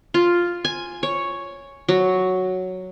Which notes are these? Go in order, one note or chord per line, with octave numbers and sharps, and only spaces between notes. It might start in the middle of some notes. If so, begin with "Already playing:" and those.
F4
G#5
C#5
F#3